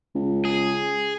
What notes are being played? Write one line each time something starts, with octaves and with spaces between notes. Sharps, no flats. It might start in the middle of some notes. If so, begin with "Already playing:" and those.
C#2
G#4